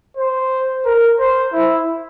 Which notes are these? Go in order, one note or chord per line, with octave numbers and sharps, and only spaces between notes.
C5
A#4
C5
E4